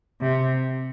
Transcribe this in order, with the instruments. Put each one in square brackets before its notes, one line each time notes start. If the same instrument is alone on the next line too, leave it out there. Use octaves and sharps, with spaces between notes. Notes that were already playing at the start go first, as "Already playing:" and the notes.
[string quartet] C3